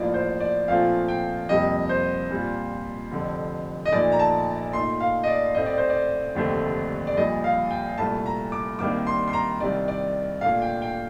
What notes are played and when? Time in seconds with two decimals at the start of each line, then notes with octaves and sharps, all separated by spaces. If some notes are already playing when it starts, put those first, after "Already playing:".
Already playing: A1 A2 F3 A#3 F4 D5
0.14 C5
0.40 D5
0.68 A#2 F3 A3 C4 F4 F5
1.08 G5
1.49 F2 C3 G3 A#3 D#5
1.89 C5
2.31 A#2 G3 C4 F4
3.12 F1 F2 D3
3.85 D#5
3.92 A#1 A#2 A3 D#4 D5
4.12 A#5
4.19 A5
4.73 A#2 A3 D#4 C6
5.00 F5
5.24 D#5
5.27 D5
5.55 A1 A2 A3 C4 D#5
5.66 D5
5.78 C5
5.90 D5
6.35 F1 D#2 D3 A3 C4
7.07 D5
7.17 A#1 A#2 G3 D#5
7.44 F5
7.71 G5
7.98 C2 A#2 A3 A5
8.26 A#5
8.52 D6
8.79 C2 C3 D#3 A#3 D4 D6
9.07 C6
9.28 C6
9.33 A#5
9.60 C2 C3 D#3 D5
9.88 D5
10.41 A#2 A3 D4 F5
10.62 G5
10.82 G5